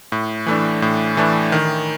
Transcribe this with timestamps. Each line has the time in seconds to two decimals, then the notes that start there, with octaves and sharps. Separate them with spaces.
0.12 A2
0.46 E3 A3 D4
0.82 A2
1.17 E3 A3 D4
1.52 D#3